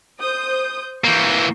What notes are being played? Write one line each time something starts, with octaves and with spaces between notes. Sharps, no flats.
C5 D#6 G6
E3 A#3 C#6 G6 C7